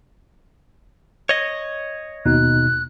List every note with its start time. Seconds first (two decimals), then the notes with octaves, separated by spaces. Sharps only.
1.29 C#5 D#5
2.26 D#2 B2 D#4 F#6